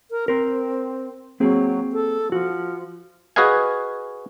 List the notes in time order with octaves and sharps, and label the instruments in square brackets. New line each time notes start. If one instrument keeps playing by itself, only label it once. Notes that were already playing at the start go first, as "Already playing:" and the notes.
[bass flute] A#4
[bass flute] C4 [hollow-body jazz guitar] A#4 C5
[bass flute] F#3 [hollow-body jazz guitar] A#3 C4 G#4
[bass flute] A4
[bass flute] F3 [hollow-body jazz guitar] F#4
[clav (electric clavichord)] F#4 G#4 B4 D#5 F5 G#5